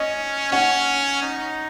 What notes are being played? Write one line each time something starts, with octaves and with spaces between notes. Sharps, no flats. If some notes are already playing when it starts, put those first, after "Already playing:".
Already playing: C#4 D#5
C#4 F#5
D#4